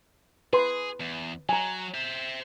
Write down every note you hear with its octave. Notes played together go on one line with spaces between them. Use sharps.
G#4 B4 C6
E2
F#3 G#5 A#5
C5 E5